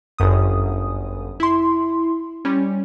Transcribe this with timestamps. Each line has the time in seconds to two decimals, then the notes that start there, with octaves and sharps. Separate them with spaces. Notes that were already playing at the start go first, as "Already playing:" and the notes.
0.18 G1 F#2 D#6
1.40 E4 C6
2.45 G3 C#4